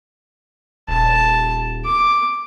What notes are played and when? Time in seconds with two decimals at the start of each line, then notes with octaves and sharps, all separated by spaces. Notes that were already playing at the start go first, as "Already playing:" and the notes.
0.89 D#1 A5
1.85 D6